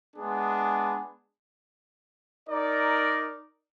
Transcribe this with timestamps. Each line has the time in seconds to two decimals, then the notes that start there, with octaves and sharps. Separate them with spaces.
0.16 G#3 B3 D4 G#4
2.49 D#4 A#4 D5